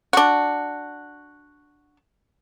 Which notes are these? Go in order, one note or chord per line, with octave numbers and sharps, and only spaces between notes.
D4 F#4